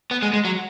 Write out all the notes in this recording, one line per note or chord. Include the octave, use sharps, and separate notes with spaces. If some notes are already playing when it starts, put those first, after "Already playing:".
B3
G#3
G#3
F#3